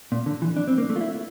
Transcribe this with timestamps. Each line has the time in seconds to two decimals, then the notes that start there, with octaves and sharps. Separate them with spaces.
0.12 A#2
0.26 D3
0.42 E3
0.56 D4
0.68 C4
0.78 A#3
0.90 A3
0.96 F4
1.01 E4